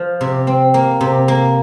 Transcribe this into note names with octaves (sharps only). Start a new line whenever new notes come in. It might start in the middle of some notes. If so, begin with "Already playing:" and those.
Already playing: F3
C3
C4
A#3
C3
A#3